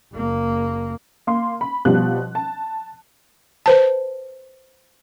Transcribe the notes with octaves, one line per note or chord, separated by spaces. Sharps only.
F#1 A#3
A#3 C6
B5
B2 F3 G3 F#6
A5
B4 C5 A5